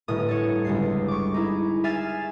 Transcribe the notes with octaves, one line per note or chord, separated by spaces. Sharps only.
G1 A2 D#6
A4 C#5
G1 C#2 C7
C#6 D6
D#4 E4 G#4
E5 G#5 F6 A6 C7 E7